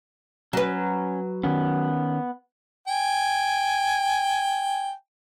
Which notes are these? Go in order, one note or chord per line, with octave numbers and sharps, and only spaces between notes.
F#3 C#4 B4
D#3 B3 C#4
G5 G#5